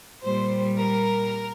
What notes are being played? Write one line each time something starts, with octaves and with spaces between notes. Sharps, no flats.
A#2 G3 C5
A#4